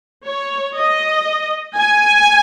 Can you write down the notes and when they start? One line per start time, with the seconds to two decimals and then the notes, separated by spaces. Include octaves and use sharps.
0.24 C#5
0.76 D#5
1.77 G#5